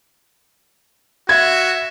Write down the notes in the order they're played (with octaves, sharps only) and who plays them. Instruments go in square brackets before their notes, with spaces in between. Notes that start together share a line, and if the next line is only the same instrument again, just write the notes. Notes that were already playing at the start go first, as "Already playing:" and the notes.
[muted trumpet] F#4 [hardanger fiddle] E5 [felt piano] G#6